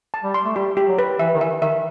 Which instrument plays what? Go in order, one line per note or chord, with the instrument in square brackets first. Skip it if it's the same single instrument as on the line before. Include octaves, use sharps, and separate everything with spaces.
[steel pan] A5
[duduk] G3
[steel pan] C6
[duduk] A3
[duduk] G3 [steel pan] G4
[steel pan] G4
[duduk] F#3
[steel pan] B4
[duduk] E3 [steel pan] E5
[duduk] D#3
[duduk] E3 [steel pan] E5
[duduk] D#3 [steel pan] E5